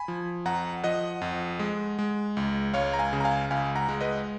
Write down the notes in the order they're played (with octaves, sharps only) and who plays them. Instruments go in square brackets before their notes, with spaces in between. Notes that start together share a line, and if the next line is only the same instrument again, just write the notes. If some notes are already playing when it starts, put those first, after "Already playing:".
Already playing: [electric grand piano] G#5 B5
F3
F2 F#5 A#5
F3 D#5 F#5
F2
G#3
G#3
C#2
C#2 C#5 F5
A#5
F5 G#5
C#3
A#5
F5 G#5
C#2 F5 G#5
F#5 A#5
G#3
B4 D#5